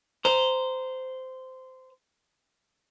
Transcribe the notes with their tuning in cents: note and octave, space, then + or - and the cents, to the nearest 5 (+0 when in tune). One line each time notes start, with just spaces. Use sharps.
C5 -15 A#5 +0